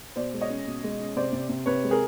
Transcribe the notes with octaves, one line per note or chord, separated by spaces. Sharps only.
B2 C5 D5
G#3
C#5 D#5
C#4
B2
G#3
C#4
C3 C5 D5
C3
C3
C3 B4 C#5
G#3
G#4 A#4